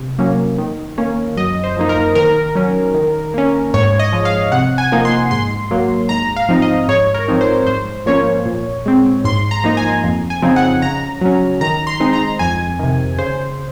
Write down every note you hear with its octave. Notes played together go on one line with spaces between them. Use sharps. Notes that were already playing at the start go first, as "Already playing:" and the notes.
Already playing: C3
F#3 A#3 C#4
D#3
A#3 C#4
F#2 D#5
C5
F3 A#3 D#4
A#4
D#3 A#4
F#3 C#4
D#3
A#3 C#4
G#2 C#5
D#5
F3 G#3
F5
C3 F#5
G#5
F3 A#3 D#4
C6
G#2 C6
F#3 A#3
G#2 A#5
F5
F3 C4 D#4
D#5
G#2 C#5
A#4
F3 C4 D#4
C5
G#2 C5
F3 A#3 C#4 C#5
A#2
G#3 C4
G#2 C6
A#5
F3 A#3 D#4
G#5
F2
G#5
C#3 F3 C4 D#4
F#5
C#3 A#5
F#3 C#4
D#3 A#5
C6
G#3 C4 D#4
A#5
F2 G#5
C3 D#3
C#3 C5